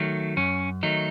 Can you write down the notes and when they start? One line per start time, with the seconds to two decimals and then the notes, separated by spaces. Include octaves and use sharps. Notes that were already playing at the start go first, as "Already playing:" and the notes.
Already playing: D#3 F#3 A3
0.37 F#2 C#4
0.83 D#3 F#3 A3 D#4